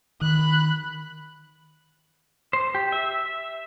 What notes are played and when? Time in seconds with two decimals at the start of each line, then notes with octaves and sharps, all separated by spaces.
0.21 D#3 B5 F#6
2.53 C5
2.75 G4
2.92 E5